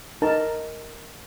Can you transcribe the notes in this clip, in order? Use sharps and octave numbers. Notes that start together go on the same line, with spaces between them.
D#4 A#4 A5